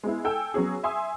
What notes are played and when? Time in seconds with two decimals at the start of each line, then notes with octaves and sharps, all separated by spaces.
0.03 G#3 B3 E4
0.24 A4 G5 G#5 E6
0.54 F#3 B3 C#4 G#4
0.83 E5 G#5 C6 D#6 E6